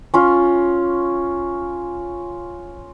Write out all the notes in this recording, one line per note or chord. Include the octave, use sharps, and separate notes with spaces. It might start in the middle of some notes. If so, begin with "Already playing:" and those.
C#4 F4